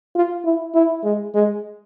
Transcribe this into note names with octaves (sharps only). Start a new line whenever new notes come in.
F4
E4
E4
G#3
G#3